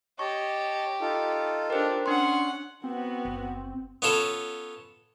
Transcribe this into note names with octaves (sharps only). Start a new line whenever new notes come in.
G4 C#5 D#5 A5 C#6
D#4 F4 A4
D4 G4 A#4 C5
C#4 D4 F#5 C6 C#6 F6
B3 C4 F#4
F#1
B3 C#4 F4 A4